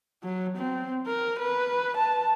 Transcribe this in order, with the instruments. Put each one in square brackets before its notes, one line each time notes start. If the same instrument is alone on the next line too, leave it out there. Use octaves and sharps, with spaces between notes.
[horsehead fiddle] F#3
C4
A#4
B4
A5